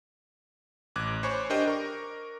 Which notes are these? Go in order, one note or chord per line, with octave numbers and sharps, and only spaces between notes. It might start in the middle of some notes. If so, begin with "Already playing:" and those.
A1 D6 F#6 G#6
C5 C#5 G#5 B5 C#6
D4 G4 A#4 C5 D#5 G5
A#4 C#6